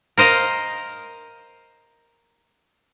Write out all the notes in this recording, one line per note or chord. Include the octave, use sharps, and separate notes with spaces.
A#4 C5 D#5 F5